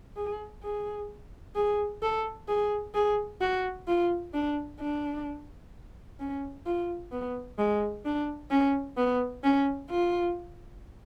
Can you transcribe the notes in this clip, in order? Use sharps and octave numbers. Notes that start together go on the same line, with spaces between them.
G#4
G#4
G#4
A4
G#4
G#4
F#4
F4
D4
D4
C#4
F4
B3
G#3
D4
C#4
B3
C#4
F4